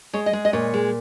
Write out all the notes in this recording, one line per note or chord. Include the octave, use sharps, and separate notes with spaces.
G#3 C#5
D#5
G#3
D#5
A#2 C#5
G#3